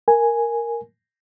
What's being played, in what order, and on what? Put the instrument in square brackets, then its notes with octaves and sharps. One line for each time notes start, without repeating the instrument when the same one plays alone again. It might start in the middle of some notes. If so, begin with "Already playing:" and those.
[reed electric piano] A#4 G#5